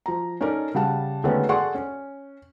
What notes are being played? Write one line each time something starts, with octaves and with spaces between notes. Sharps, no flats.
F3 A#5
C#4 D#4 A4 A#4 D5
C#3 G3 F#5 A5
D3 D#3 G#3 A3 B3 C#4
G#4 A4 D5 F#5 C6 C#6
C#4